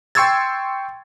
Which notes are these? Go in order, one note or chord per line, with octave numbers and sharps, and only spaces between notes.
G5 C6 C#6 E6 G#6 A6